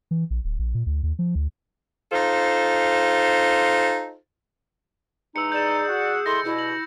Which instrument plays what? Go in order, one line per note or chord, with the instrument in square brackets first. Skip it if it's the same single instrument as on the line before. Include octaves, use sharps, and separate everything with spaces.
[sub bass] E3
A#1
D1
A#1
A#2
D2
D#2
F3
D2
[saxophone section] D#4 F4 A4 C5
[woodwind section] E3 G#3 D#4 [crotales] E6 C#7
[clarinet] G#4 [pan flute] D5 [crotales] G6 E7
[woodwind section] F#4 F#5
[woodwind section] G#3 E4 A4 [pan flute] C6 [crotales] A#6
[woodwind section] E2 G2 B2 [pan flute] E4
[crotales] F#7